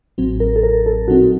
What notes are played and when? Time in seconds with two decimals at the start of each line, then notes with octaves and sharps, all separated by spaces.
0.18 A1 A2 F#3 C4
0.40 A#4
0.56 A4
0.63 A#4
0.86 A4
1.08 A#2 F#3 C4 D#4 F#4